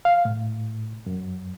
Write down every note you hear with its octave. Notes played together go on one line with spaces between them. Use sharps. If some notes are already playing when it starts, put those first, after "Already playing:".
F5
A2
F#2